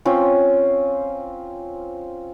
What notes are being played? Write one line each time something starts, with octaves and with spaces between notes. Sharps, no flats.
C4 C#4 F4